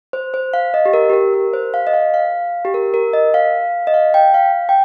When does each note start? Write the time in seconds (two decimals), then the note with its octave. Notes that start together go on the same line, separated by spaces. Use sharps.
0.13 C5
0.34 C5
0.54 F5
0.74 D#5
0.86 G4
0.93 A#4
1.10 G4
1.13 A#4
1.34 A#4
1.53 C5
1.74 F5
1.87 D#5
1.94 F5
2.14 F5
2.65 G4
2.74 A#4
2.94 A#4
3.13 D#5
3.34 F5
3.87 D#5
3.94 F5
4.14 G5
4.34 F5
4.69 G5